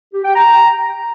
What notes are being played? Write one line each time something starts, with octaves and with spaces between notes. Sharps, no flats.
G4
G5
A#5